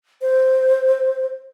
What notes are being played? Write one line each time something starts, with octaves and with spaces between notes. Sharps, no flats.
C5